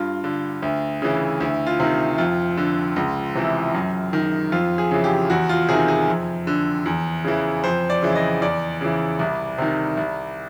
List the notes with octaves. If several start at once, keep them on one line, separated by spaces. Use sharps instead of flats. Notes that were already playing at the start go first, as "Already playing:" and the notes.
Already playing: G2 F4
D3
D2
C#3 E3
D2 E4
F4
C3 D#3
F2 F4
D3
C#2
C3 E3
F#2
D#3
F2 F4
G#4
C#3 E3
G4
E2 F#4
F4
C3 D#3 G#4
G#4
F2
D3
E2
C#3 E3
F2 C5
D5
C#3 E3
D#5
E2 D5
C#3 E3
C2
C3 D#3
C2